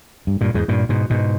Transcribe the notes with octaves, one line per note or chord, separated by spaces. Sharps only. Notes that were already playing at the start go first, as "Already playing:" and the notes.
G2
G2 A#2
E2 G#2
G2 A#2
G#2 B2
G#2 B2